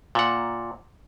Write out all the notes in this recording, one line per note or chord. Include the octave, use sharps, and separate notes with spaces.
A#2 F#5